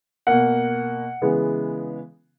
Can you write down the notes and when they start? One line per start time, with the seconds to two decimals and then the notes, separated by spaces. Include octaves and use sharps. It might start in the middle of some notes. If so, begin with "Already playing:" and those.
0.27 B2 A#3 F#5
1.22 C#3 E3 G#3 B3